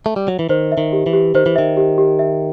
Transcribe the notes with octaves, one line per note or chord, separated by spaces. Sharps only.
A3
G3
F#3
E3
D#3 C5
E5
D#3
G4
E3
G4
D#3 C5
E3
D#3 E5
G4
G4
E5